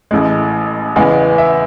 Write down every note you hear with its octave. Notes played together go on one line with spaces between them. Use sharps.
A1 A2 G#3
E2 C#3 G#3 B3
E5